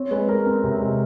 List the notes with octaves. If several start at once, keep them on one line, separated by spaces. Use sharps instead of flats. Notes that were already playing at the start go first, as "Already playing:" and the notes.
Already playing: C4 C#5
G#3 B4
G#3 A#4
C4
C3
G#3